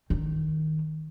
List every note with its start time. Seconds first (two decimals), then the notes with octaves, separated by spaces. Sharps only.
0.10 D#3